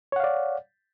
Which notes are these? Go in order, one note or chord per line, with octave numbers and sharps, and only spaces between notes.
C#5 D5 F5 F#5